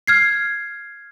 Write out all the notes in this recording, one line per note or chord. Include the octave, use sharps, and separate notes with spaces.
F6 G#6 C7